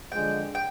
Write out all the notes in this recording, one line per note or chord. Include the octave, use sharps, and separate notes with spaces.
D3 F3 G#3 D4 G5
G5